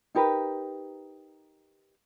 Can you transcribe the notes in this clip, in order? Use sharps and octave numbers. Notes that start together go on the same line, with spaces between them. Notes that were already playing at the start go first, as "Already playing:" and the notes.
D#4 G4 A#4 B4